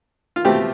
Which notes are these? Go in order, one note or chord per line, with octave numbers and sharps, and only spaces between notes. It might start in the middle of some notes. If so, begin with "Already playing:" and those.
F4
B2 A3 C4 G4